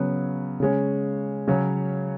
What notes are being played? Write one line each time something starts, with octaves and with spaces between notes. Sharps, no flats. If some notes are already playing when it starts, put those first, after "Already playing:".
Already playing: C#3 F#3 B3
C#3 G#3 C#4
C#3 F#3 C#4